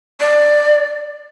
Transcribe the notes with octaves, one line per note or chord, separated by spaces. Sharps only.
D5